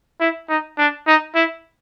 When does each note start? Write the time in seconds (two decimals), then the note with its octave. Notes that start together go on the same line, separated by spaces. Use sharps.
0.20 E4
0.49 D#4
0.78 D4
1.07 D#4
1.35 E4